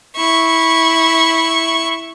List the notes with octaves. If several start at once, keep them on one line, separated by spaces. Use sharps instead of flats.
E4 C#6